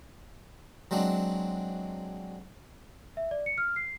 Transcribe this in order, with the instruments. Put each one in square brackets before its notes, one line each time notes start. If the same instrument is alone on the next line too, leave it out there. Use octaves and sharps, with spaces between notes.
[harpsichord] F#3 G#3 C4 D4
[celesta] E5
D5
C#7
F6
C7